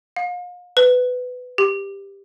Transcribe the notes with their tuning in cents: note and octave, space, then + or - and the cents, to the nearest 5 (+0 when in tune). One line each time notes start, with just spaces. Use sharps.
F5 +35
B4 +15
G4 +15